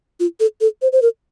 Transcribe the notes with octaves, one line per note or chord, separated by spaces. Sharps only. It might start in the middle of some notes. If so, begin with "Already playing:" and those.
F4
A4
A4
C5
C5
A#4